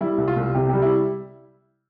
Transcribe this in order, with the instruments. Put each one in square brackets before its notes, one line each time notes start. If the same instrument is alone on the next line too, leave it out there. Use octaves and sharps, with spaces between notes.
[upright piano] G3 E4
C2
F4
C2
C3 G4
G3 G4
E4